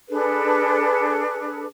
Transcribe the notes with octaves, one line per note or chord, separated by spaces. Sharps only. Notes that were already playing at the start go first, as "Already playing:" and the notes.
D4 G#4 A4 B4